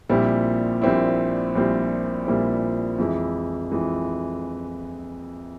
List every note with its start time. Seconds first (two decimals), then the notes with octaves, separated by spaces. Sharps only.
0.09 A#1 A#2 G3 C4 E4
0.82 A#1 A#2 G3 C4 E4
1.55 A#1 A#2 G3 C4 E4
2.26 A#1 A#2 G3 C4 E4
2.98 F2 E3 G#3 E4
3.71 F2 E3 G#3 E4